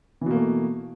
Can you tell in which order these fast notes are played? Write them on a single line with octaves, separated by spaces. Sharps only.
E3 B2 A#3 A3